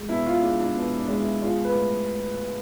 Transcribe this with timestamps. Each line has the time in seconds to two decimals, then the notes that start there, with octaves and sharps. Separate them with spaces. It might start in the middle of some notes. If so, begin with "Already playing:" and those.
Already playing: G#3
0.09 B2 E4
0.26 F4
0.42 G#3 D4
0.59 D4
0.75 B2
0.98 D4
1.08 G#3
1.20 E4
1.42 G#3 F4
1.65 B4
1.75 A2